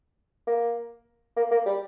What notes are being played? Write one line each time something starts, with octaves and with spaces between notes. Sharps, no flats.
A#3
A#3
A#3
G3